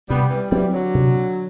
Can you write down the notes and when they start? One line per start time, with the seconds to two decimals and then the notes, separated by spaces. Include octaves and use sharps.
0.09 C3 G3 B3
0.30 E3 G3
0.51 E3 F#3 G3 C4
0.73 D3 F#3
0.95 C3